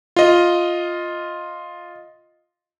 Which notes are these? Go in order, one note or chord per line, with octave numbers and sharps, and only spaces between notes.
F4 D#5